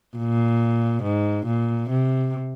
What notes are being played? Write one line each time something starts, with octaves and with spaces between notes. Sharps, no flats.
A#2
G#2
A#2
C3